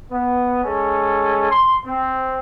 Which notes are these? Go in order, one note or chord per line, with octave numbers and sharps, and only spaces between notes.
B3
G#3 C#4 A4
C6
C4